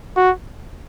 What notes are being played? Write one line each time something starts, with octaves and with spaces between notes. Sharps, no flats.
F#4